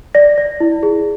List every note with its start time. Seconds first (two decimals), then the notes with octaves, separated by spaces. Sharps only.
0.15 D5 A#6
0.38 D5
0.60 E4
0.83 G#4